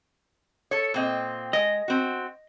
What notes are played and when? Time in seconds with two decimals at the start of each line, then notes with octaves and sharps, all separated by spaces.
0.71 A4 C#5
0.94 A#2 C4 D#5
1.53 G#3 D#5
1.88 C4 F#4